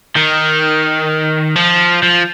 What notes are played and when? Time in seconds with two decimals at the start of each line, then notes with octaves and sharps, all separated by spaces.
0.16 D#3
1.56 F3
2.03 F3